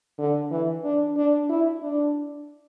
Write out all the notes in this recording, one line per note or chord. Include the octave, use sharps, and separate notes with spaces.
D3
E3
D4
D4
E4
D4